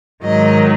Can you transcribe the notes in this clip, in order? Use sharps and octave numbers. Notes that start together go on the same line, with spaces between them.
G#2 D#3 F#3 D#5